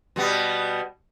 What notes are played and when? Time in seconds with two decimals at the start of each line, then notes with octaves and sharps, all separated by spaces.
0.16 B2 G3 B3